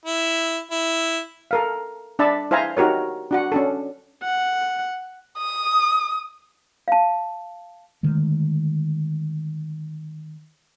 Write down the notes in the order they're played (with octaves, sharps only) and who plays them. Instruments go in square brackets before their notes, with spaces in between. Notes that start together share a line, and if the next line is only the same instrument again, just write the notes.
[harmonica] E4
E4
[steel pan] A4 A#4 F5
D4 D5 E5 A5 B5
E4 C5 E5 F5 G#5 A#5
D#4 F#4 G4 A#4 C#5
D4 F#4 F#5
C#4 D4 A4
[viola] F#5
[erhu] D#6
[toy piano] F5 A5
[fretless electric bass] D3 D#3 G#3 A3